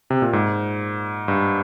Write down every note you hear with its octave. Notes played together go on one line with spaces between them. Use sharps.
C3
A#2
G#2
G2